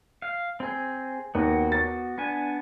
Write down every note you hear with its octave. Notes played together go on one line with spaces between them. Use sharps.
F5
C4 G#4
D#2 B3 F#4
A6
B3 D4 G#5